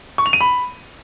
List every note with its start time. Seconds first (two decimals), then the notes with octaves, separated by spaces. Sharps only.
0.18 C#6
0.26 F7
0.33 D#7
0.41 B5